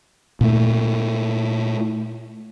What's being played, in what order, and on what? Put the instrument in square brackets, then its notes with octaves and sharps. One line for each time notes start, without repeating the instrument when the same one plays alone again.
[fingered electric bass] A#2 A3